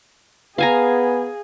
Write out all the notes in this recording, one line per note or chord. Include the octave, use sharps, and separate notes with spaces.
B3 G#4 F5 G#5 A#5